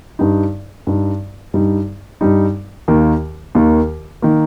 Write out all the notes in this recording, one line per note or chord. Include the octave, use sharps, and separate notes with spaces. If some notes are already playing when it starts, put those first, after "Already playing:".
G2 G3 D#4
G2 G3 D#4
G2 G3 D#4
G2 G3 D#4
D#2 D#3 A#3
D#2 D#3 A#3
D#3 A#3